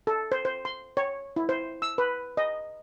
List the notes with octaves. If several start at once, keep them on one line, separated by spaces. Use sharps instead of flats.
A4
C5
C5
C6
C#5
E4
C5
E6
B4
D#5